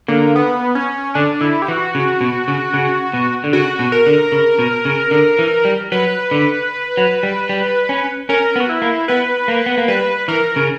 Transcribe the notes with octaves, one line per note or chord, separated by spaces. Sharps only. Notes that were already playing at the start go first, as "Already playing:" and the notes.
D3 A#3
B3
C#4
D3 D4
D3 E4
G4
E3 F#4
C#3
B2
C#3
C#3
B2
D3
C#3 F#4
B2
A#4
D3
C#3
B2
C#3
D3
E3
G3
F#3 B4
D3
F#3
G3
G3
C#4
C#4 A#4
B3
F#4
E4
A#3
B3 B4
A#3
B3
A#3
G3 B4
E3 A#4
C#3